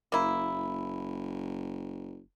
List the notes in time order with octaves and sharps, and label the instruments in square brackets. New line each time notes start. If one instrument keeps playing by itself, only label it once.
[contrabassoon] F#1 [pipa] A#3 E4